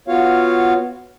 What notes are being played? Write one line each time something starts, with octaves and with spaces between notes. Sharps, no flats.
B3 F4 F#4 C#5 F5